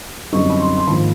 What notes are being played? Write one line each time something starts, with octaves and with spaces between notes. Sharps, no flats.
F#2 D3 G3 C4 D#4 C#6
B5
C6
C6
G#1 G#2 F3 A#3 B5